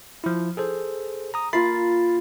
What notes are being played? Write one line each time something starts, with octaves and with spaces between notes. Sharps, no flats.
F3 E4
G#4 A4 C5
A#5 D#6
A#3 F4 B5 A6 C7